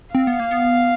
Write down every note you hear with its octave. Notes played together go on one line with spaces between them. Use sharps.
C4 F5
B3
A#3
B3